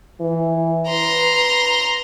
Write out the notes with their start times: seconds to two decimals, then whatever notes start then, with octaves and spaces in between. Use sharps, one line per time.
0.20 E3
0.88 B4 A#5 C6